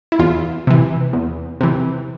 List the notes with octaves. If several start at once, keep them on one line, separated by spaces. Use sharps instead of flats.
E4
E2 F4
C3 E3
E2
C3 E3